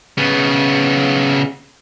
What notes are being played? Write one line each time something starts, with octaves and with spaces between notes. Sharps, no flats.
C#3 B3